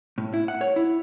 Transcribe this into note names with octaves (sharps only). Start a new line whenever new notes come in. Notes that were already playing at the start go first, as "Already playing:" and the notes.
A2
E4
F#5
C#5
E4